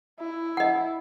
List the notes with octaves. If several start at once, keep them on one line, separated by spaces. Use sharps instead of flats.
E4
D#5 F#5